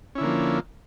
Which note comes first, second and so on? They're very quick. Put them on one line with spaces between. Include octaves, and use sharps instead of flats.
C#4 E4 D3 A#3 F3